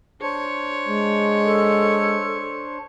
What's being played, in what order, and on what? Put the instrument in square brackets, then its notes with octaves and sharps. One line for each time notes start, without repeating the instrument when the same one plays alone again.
[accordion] D4 C5 [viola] C#5
[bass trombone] G#3
[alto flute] A4